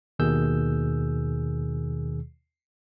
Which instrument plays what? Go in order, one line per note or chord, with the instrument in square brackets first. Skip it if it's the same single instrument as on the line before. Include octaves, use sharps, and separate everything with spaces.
[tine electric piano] D#2 B2 D#3 G#4 E6 G6